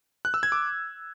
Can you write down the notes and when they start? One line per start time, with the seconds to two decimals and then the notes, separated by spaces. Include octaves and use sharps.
0.25 F#6
0.34 E6
0.43 G#6
0.52 D6